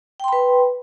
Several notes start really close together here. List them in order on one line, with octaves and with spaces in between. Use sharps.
G5 C6 B5 B4